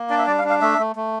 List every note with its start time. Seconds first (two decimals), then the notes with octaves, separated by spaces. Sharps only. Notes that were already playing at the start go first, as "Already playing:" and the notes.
Already playing: A#3
0.10 D4 D5
0.18 E5
0.27 G3 D5
0.39 F5
0.44 D4
0.50 F5
0.61 A3 E5
0.78 A3
0.96 A3